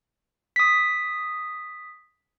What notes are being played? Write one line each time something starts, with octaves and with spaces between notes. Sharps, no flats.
D#6 B6